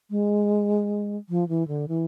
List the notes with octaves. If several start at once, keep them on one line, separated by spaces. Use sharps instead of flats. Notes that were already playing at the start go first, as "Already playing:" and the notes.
G#3
F3
E3
D3
E3